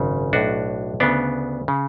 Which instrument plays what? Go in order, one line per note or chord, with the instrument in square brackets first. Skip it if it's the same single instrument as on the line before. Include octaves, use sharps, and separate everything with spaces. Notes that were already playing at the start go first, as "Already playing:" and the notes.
Already playing: [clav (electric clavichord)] G#1 F#2 C#3
B1 A2 D4 F#4
D2 C#3 B3 D4
C#3